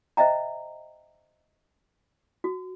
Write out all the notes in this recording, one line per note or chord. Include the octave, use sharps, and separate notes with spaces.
C5 D#5 E5 G5 A#5
F#4